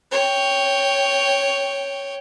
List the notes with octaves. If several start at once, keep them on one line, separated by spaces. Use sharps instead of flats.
C#5 G5